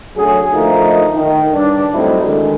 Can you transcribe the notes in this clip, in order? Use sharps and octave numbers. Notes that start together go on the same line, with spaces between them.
D3 F#3 A3 C#4 G#4
D3 F3 A3 A#3 D#4
D#3
G2 C#3 D4
F#3 G3 A3 C4 D#4 E4
D3 D#3 G#3